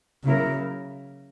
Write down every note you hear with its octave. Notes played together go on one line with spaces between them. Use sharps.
C#3 F#3 A#3 E4 A#4